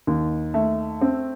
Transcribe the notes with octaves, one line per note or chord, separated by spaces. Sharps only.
D#2
A3
C4